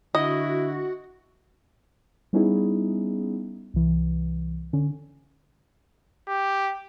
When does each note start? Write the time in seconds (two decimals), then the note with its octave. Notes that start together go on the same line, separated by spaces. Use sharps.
0.15 D3 E4 F#4 D#5
2.33 G3 B3 C#4 D#4 E4 G#4
3.74 C2 E3
4.73 D3 C#4
6.28 G4